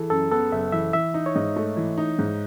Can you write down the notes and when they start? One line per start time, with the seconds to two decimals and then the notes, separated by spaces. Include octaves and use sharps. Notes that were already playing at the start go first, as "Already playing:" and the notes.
Already playing: E3 G#4 A4
0.10 F#2 A4
0.31 B3 A4
0.52 F#1 E5
0.72 E3 E5
0.93 E3 E5
1.14 D#4
1.26 C#5
1.35 G#2 D#5
1.56 A3
1.77 E3
1.98 D#4
2.19 G#2